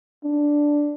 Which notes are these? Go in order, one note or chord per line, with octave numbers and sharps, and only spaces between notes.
D4